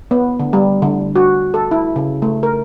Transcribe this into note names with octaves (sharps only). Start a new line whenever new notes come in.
B3
D3
G3
D3
F#4
A4
E4
C#3
A3
A#4